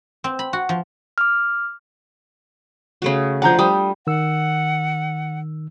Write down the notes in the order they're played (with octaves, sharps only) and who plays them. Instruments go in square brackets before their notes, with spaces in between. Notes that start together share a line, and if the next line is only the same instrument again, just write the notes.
[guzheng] C4
B5
F#4
F3
[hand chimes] D6 F6
[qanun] C#3 A3 F#4
[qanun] F3 D4 [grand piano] F#5 A#5 G6
[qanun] G3 [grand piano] D#6
[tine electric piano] D#3 E6 [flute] F#5